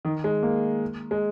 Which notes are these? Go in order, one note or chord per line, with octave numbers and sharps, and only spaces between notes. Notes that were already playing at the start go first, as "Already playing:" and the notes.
D#3
G#3
A#3
G#3